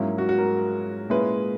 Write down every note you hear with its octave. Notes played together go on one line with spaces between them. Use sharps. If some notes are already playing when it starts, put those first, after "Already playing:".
Already playing: G#2 F#3 A#3 C#4 E4
F#4
F#4
A#4
A#2 G#3 C#4 E4 B4